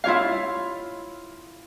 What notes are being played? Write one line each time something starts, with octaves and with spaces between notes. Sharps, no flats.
E4 F4 C#5 F5